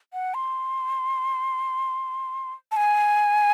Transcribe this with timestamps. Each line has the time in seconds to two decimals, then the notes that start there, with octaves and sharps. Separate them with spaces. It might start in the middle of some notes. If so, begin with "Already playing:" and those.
0.13 F#5
0.34 C6
2.72 A5
2.77 G#5